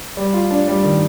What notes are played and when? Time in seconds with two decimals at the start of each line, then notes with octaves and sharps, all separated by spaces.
0.17 G3
0.34 F4
0.51 D4
0.68 G3
0.84 D#3